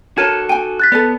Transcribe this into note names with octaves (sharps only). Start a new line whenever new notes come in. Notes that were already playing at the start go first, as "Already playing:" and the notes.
F#4 A4 A#4 C#5 A5 G#6 D#7 E7
G5 G#5 D#7
F#6 A6 B6
B3 A4 B4 D5